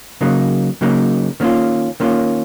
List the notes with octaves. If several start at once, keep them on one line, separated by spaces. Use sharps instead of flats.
C#3 F#3 A#3 D#4
C#3 F#3 A#3 D#4
D#3 A#3 C#4 F4
D#3 A#3 C#4 F4